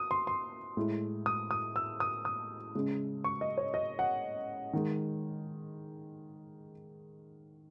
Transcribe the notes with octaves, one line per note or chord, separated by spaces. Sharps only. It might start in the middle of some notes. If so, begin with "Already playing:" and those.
Already playing: D#6
C6
C6
A2 G#3
D#6
D#6
E6
D#6
D#6
C#3 G#3
C#6
D#5
C#5
D#5
F#5
D#3 G#3